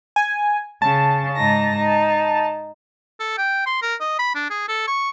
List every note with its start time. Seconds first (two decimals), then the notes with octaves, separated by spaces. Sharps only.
0.16 G#5
0.82 C#3 A5
1.35 G#2 D#4 A#6
1.76 D#4
3.20 A4
3.38 G5
3.66 C6
3.82 A#4
4.00 D#5
4.19 B5
4.35 D4
4.50 G#4
4.68 A4
4.87 C#6